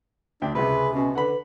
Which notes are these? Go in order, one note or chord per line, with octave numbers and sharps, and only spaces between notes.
D2 D4 E5 G5
C#2 C3 G#4 B4
B2 C#4
D3 B4 F#5 B5